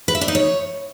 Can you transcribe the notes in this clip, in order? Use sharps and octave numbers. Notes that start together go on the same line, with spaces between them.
B4
E5
D4
D#4
C#5